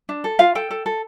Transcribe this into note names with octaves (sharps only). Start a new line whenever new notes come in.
D4
A4
F4 F5
A4 G5
A4
A4